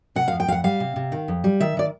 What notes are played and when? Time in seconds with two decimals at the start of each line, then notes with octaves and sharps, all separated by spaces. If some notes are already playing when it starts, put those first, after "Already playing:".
0.16 C3 F#5
0.28 F2 F5
0.40 G5
0.48 F2 F5
0.52 F#5
0.64 G3 F5
0.80 C3
0.96 C3
1.12 D#3
1.28 F2
1.44 G3
1.60 D#3 E5
1.77 D#3 D5